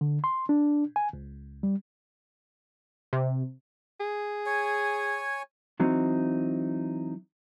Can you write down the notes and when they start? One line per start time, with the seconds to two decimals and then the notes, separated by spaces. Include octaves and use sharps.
0.01 D3
0.24 C6
0.49 D4
0.96 G#5
1.13 C#2
1.63 G3
3.13 C3
4.00 G#4
4.46 C#5 G#5
5.80 E3 F#3 C4 D#4